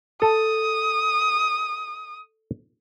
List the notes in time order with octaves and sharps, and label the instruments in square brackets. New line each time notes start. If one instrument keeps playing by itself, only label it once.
[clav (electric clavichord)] A4 [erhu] D#6